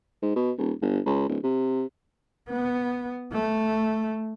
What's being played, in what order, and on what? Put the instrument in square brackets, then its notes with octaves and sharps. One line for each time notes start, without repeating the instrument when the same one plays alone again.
[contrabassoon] G#2
B2
D#1
G1
C#2
D1
C3
[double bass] B3
A3